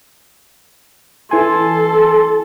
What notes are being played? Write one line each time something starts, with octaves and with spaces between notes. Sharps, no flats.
E3 A4 G#5 C6